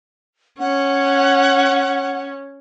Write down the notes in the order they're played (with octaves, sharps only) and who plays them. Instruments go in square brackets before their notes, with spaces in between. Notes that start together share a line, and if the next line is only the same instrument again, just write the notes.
[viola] C#4 [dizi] F#5